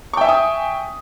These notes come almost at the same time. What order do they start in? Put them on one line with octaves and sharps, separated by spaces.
C#6 G5 E5 G#5 D#6